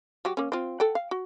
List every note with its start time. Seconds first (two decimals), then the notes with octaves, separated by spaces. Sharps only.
0.25 F#3 F#4 G4
0.37 A#3 C#4
0.52 C4 F4
0.80 A4 F#5 G5
0.95 F5
1.11 F#4